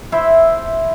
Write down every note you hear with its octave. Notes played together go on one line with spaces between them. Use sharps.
E4 C5 E5